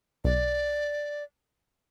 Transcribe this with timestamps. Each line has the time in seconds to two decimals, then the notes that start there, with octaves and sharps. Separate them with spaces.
0.25 B1 D5